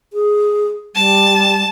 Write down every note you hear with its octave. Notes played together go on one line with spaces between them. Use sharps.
G#4
G3 A5